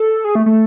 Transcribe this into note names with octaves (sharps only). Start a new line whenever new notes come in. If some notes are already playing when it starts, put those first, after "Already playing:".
Already playing: A4
G#4
A3
A3